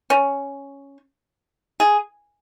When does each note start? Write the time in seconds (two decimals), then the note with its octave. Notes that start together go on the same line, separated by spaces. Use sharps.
0.10 C#4
1.80 G#4